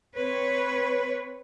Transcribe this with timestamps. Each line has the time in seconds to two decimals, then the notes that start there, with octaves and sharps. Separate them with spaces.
0.15 C4 B4 C#5